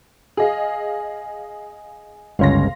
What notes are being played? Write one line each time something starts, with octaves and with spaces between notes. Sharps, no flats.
G#4 D#5 F5
G1 C#2 C#4 F5 C6 A#6